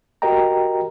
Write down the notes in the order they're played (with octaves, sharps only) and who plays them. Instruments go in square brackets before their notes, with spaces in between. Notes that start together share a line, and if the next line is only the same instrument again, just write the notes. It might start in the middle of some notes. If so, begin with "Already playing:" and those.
[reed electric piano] F#4 G4 A#4 D#5 G5 A#5